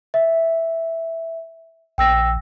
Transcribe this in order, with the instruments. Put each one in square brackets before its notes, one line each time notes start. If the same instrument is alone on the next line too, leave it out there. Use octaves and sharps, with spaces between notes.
[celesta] E5
[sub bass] A#1 [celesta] G5 E6 A#6